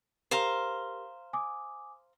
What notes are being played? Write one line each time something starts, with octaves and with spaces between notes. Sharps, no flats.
G4 A#4 C5 F5 A#5 C6
G#5 D6 D#6